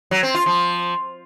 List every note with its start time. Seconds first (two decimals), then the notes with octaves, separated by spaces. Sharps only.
0.11 F#3
0.23 C4
0.35 F4
0.46 F3